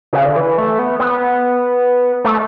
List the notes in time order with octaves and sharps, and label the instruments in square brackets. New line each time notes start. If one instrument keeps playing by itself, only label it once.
[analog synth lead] C#3
D3
E3
A3
B3
B3
A3